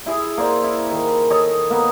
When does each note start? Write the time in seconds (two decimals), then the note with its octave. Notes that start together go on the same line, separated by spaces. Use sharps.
0.06 E4 G#4 E5
0.37 A#3 C5 D5
0.64 E4
0.91 D#3
1.30 A4 C#5 D#5
1.70 A#3 B3